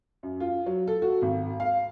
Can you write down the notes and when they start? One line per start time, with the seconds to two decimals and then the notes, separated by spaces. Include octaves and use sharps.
0.23 F#2
0.40 F4
0.66 F#3
0.87 A4
1.02 F#4
1.22 G#1
1.60 F5